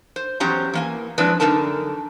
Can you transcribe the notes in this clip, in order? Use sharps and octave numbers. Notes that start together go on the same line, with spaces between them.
C5
E2 F#3 C#4 G4 C5 A#5
E3 A#3 G#5
F3 G#3 C4 D4 E4 B4
F#2 D3 G3 D#4 A#4 A5